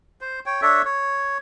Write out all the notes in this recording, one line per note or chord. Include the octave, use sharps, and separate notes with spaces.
C5
C#5 G5
D4 A4 C#5 E5
C#5